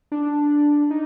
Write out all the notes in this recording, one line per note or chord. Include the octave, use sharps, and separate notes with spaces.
D4
D#4